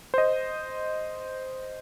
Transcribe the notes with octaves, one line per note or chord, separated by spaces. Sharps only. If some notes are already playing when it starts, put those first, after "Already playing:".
C5 D#5